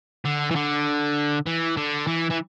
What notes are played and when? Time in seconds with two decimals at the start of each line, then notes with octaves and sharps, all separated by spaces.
0.25 D3
0.51 E3
0.56 D3
1.47 E3
1.77 D3
2.08 E3
2.31 E3